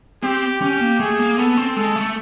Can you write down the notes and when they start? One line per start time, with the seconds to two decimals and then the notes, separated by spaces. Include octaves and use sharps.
0.23 C4 G4
0.62 C#4 G4
0.81 A#3
1.00 A3 G#4
1.19 A#3
1.38 B3 A4
1.57 C4
1.76 G#3 A4
1.96 A3